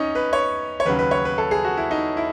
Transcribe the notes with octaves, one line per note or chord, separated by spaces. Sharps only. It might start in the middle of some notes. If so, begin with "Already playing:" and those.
Already playing: C#4 D#4
B4
C#5
C#5
D#2 C#3 F#3 B4
B4
C#5
B4
A4
G#4
F#4
E4
D#4
E4